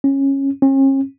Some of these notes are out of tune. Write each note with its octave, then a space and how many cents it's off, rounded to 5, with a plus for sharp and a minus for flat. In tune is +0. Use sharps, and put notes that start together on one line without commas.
C#4 -15
C#4 -40